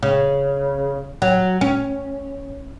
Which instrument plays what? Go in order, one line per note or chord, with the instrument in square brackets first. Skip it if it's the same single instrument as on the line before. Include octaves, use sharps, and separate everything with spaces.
[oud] C#3
F#3
C#4